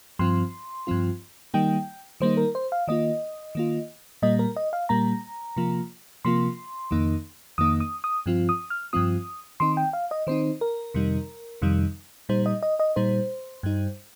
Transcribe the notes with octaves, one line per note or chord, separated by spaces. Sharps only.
G2 F3 C4 F4 C6
G2 F3 C4 F4
D#3 G3 A#3 D#4 G5
D#3 G3 A#3 D#4 C5
A#4
C5
F5
D#3 A#3 F4 D#5
D#3 A#3 F4
A#2 G3 A#3 D#5
A#4
D#5
F5
A#2 G3 A#3 A#5
C3 F3 A#3 F4
C3 F3 A#3 F4 C6
F2 D#3 A#3 D#4
F2 D#3 A#3 D#4 D#6
D#6
D#6
G2 F3 C4 F4
D#6
F6
G2 F3 C4 F4 D#6
D#3 C4 D#4 C6
G5
F5
D#5
D#3 C4 D#4 C5
A#4
F2 C3 D#3 G3 D#4
F2 C3 D#3 G3 D#4
A#2 G3 D#4 C5
D#5
D#5
D#5
A#2 G3 D#4 C5
G2 G3 D#4